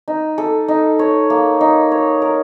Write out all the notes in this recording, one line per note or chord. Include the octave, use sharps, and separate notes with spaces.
D#4
A4
D#4
C#5
A#3
D#4
C#5
A#4